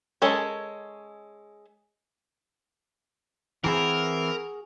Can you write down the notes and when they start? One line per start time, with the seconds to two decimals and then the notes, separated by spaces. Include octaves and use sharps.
0.22 G#3 C#4 A4 A#4 C#5
3.64 E3 C4 E4 F#4 G#4 A#4